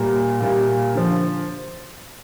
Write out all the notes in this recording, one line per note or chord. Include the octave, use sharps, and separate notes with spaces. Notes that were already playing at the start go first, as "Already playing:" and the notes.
Already playing: A#2 G3 A#3
A#2 G3 A#3
D3 F3